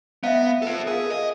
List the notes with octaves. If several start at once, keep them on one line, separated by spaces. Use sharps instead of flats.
B3 E5 F5
F4 A4
G#4 A#4 F5
D#5